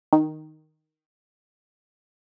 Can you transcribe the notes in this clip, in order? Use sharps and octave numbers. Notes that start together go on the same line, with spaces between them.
D#3